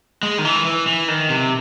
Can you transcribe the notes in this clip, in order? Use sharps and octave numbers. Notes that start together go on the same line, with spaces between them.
G#3
D#3
E3
E3
E3
D#3
C3